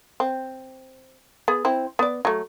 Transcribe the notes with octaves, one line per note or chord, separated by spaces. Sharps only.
C4
B3 G#4
C4 E4
B3 D5
F#3 A3